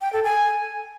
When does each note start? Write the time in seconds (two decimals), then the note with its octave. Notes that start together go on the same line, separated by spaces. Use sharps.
0.01 G5
0.13 A4
0.24 G#5